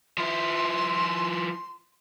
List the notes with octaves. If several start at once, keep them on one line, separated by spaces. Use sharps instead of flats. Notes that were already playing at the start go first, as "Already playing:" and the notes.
F3 E4 C6